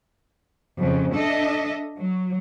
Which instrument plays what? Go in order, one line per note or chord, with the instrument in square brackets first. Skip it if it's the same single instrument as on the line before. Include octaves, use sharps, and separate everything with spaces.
[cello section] F2 C#3
D4 A4 D#5 E5
F#3